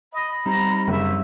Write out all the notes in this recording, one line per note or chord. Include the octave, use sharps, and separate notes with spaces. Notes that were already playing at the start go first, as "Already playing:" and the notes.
D#5 B5
G3 C4 D#4 A#5
F#1 E5